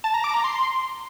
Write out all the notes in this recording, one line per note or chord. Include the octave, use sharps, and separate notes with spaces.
A5
A#5
D6
A#5
C6